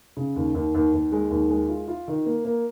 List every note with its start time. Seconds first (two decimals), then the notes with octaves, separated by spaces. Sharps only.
0.17 C#3
0.36 D#2
0.55 D#2
0.75 D#2
0.93 D#2
1.12 G#3
1.30 D#2
1.50 G#3
1.69 F4
1.88 F4
2.08 D#3
2.26 A#3
2.45 A#3